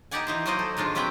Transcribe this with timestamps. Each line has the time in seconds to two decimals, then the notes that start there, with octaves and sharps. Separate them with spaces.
0.11 B3 D#4 G4 D5 F#5 G#5
0.27 E3 D#4 C5
0.46 F#3 A#3 D#4 C5 D5 D#5
0.59 A4
0.77 D#3 G#3 D4 F4
0.95 B2 F#3 C4 C#4 B4 G5